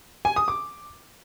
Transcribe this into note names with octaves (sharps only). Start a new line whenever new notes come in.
G#5
D#6
D6